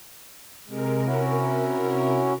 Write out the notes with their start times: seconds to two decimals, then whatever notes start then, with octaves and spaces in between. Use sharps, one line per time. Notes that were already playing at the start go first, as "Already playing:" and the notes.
0.68 C3 G#3 A#4
1.06 C#4 E4 F#4